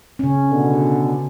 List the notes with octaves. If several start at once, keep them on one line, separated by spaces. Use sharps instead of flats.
C#3 C#4
B2 D3